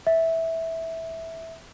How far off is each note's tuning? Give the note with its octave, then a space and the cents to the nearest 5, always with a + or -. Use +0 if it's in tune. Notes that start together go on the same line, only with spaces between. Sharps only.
E5 -10